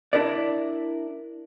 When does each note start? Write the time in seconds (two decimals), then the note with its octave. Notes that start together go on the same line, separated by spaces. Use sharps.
0.13 D4 E4 A#4 D5